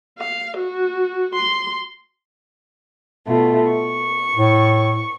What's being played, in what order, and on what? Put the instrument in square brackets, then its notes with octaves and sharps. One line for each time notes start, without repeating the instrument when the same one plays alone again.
[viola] F5
F#4
C6
[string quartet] B2 A3 F4
C#6
[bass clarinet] A2